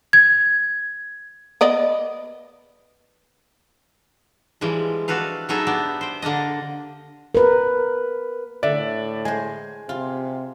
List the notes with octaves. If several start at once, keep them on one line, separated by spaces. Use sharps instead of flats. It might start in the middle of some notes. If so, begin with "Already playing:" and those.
G#6
B3 D5 D#5
E3 F3 G3 G#3
D4 F#4 A4 B4 F5
F#3 B3 D#4 G#4 A4 E5
B3 D4 G4
C5 G5
D3 A#3 D4 D#5
A#4 B4
A2 D3 D5 E5
G#3 C5 G#5
C3 F4